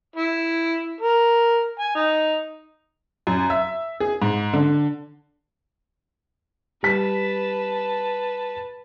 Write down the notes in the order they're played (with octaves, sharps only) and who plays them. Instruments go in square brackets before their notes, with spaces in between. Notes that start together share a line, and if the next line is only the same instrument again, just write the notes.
[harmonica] E4
A#4
G#5
D#4
[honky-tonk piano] F#2
E5
G#4
G#2
D3
[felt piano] G3 B6 [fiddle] B4 A5